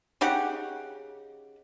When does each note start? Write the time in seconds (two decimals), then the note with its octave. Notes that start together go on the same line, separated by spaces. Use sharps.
0.21 C#3 D#4 G4 F#5